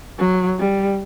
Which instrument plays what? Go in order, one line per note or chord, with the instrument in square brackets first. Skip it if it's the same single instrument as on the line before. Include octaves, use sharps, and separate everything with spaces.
[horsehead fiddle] F#3
G3